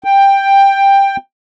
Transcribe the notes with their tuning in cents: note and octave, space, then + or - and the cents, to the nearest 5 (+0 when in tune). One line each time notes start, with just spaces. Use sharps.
G5 +10